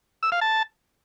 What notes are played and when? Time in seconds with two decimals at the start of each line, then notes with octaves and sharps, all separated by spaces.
0.23 E6
0.32 F5
0.41 A5